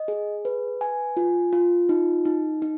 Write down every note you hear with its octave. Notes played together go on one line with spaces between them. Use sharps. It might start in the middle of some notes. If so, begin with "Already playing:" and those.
Already playing: D#5
G#4
B4
G#5
F4
F4
D#4
D#4
D#4